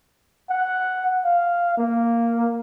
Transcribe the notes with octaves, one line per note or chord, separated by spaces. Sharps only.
F#5
F5
A#3